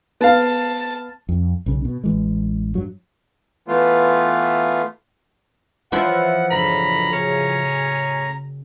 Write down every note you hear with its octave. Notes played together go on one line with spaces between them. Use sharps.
B3 F5 A5
F2
B1 C#3
B2
A1 E3 G#3
G2 F#3
E3 A3 B3 F4
E3 F3 E4 C#5 F#5
F#1 A2 D3 F#3 A#5 B5
A2 C#3 C#4 G#4